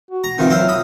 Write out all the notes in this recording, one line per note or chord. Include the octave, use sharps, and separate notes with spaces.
F#4
A#5
D#3 E3 C4 F4
F#3 C4 E5 F5
B5 D#6